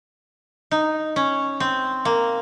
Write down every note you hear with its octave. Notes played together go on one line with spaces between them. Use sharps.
D#4
C#4
C4
A#3